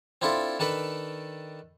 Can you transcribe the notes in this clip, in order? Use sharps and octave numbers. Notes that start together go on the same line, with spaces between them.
C4 D4 E4 F4 A4
D#3 D4 A4 B4